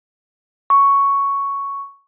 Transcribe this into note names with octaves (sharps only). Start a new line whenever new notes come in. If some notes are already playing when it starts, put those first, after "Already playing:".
C#6